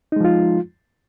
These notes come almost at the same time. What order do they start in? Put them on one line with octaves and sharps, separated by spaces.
D#4 G#3 F3 F4